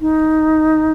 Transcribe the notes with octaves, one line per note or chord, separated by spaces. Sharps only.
D#4